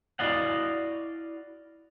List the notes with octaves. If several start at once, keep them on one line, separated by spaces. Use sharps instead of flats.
E4 F#4 D5 D#5 F5 F#5